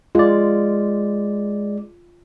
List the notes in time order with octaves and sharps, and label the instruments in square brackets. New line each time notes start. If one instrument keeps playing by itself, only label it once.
[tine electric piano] G#3 D5 [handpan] F4